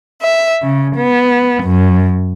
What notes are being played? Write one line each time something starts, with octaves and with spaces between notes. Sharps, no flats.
E5
C#3
B3
F#2